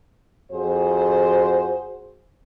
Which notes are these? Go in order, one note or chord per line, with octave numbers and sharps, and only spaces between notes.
F2 F#4 G#4 C5